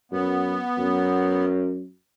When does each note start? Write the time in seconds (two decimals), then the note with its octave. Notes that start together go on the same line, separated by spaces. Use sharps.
0.12 F#2 B3
0.78 F#2